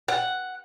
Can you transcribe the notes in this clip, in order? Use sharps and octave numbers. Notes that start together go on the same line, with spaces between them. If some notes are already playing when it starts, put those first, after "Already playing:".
F#5